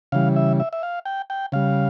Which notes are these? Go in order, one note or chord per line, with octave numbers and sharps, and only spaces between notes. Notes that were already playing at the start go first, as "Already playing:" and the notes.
C#3 E3 G3 F5
E5
E5
E5
F5
G5
G5
C#3 G3 F5